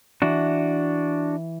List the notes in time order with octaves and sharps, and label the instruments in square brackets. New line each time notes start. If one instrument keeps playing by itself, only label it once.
[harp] E3 [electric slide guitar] D4 F#4